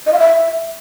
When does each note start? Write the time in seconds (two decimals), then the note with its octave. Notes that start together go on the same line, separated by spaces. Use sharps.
0.06 D#5
0.13 F5
0.19 E5